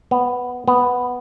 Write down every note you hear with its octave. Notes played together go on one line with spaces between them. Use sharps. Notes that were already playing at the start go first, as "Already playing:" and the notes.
B3
B3